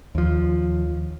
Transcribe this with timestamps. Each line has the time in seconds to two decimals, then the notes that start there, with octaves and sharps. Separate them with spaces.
0.15 D#2 F3